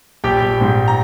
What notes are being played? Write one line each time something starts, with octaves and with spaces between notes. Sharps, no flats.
A#1 G4 G5
A#1
G#2
A#5